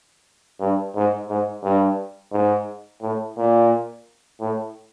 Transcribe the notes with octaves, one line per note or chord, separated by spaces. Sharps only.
G2
G#2
G#2
G2
G#2
A2
A#2
A2